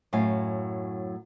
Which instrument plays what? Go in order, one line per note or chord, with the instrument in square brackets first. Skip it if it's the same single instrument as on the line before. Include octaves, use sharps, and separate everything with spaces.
[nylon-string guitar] F#2 A2 F#3 F5 G#5